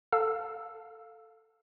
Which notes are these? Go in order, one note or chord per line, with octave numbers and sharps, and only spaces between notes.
A4 F5 E6